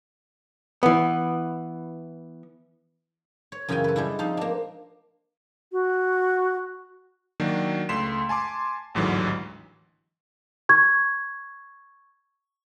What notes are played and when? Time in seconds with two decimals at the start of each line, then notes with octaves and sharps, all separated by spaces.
0.83 E3 B3
3.52 C#5
3.69 F#2 C#3 E3 F4 G5 G#5
3.84 A4 B4
3.96 G3 G#3 D4 E4
4.19 F3 C4 D#4 F5
4.37 A#3 D4
5.72 F#4
7.40 D#3 F#3 A#3 D4 F#4
7.89 C#2 A3 C6 B6 E7
8.29 G#5 A5 C6 D6
8.95 A1 D#2 G#2 D3 E3 F#3
10.69 C#6 G#6